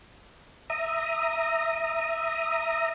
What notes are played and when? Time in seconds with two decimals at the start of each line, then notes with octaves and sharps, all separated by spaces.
0.70 E5 A#5 D#6